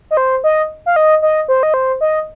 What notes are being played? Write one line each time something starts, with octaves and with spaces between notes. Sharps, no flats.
D#5
C5
D#5
F5
D#5
D#5
C5
D#5
C5
D#5